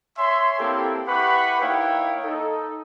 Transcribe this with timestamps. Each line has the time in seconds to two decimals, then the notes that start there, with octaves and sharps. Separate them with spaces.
0.17 C#5 E5 G#5 C6
0.59 A#3 C4 E4 G4 A4
1.06 E4 G4 B4 F#5 B5 C#6
1.60 A#3 D#4 E4 C#5 F5 G5
2.24 D#4 A4